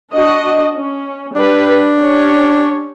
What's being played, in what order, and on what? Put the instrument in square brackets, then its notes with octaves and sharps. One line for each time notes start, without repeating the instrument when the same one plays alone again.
[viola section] D4 F#4 D#5
C#4
[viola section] G3 G4 B4 [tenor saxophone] D4
[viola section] C#4 G4 C#5